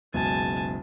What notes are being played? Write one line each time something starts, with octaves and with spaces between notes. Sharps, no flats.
F#1 C#2 B2 G#5 A5